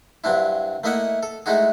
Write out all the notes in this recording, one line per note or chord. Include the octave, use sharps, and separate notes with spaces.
G2 F#3 C4 D4 E4
A3 A#3 E4 D#5 E5 F#5
A4
G#3 A3 D#4 E4 F#4 G#4